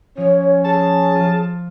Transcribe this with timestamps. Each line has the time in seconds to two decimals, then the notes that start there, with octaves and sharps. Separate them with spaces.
0.17 F3 C#4 C#5
0.65 G#4 A5
1.15 F3 F4